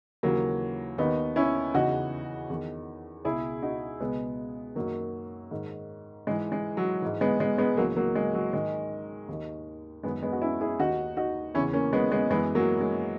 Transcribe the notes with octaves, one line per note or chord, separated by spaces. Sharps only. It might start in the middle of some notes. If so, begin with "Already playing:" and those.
D#2 C#3 E3 F#3 A#3
D#2 D#3 B3 D#4
C#4 E4
E2 C#3 E3 D#4 F#4
E2 D#3
C#2 B2 E4 G#4
D#4 F#4
C#2 B2 G#3 B3
F#2 D#3 F#3 A#3
G#2 D#3
G#2 E3 G#3
G#3
F#3
G#2 E3
G#3 B3
G#3 B3
G#3 B3
C#2 C#3 E3 F#3 A#3
F#3 A#3
G#3
F#3
G#2 D#3 G#3
D#2 D#3
F#2 D#3 G#3 B3
G#3 B3
F#4
C#4 E4
E4 G#4
D#2 D#3 D#4 F#4
D#4 F#4
E2 C#3 E3 C#4 E4
A#3 C#4
G#3 B3
G#3 B3
F#2 E3 G#3 B3
F#3 A#3
G#3